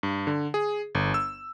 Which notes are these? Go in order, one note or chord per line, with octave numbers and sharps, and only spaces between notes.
G2
D3
G#4
G1
E6